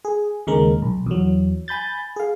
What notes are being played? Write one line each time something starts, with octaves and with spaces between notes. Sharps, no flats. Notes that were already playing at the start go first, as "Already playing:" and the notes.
G#4
D#2 C#3 G#3 A#4
B1
E2 F#3
G#5 B5 G6 A6
G#4 F5